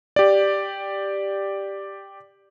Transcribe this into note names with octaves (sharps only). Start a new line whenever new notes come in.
G4 D5